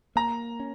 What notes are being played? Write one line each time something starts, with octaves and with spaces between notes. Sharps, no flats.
A#3 A#5
C#4